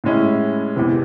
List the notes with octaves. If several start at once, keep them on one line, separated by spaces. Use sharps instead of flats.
A2 G#3 C#4 E4
E2 C3 E3